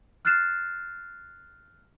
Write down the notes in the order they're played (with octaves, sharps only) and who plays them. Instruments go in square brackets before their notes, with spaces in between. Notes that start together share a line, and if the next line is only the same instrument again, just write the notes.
[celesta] F6 F#6 A6 C7 E7